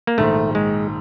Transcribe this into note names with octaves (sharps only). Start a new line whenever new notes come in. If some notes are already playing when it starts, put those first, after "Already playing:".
A#3
A#1 G#2 D#3 A3
G#3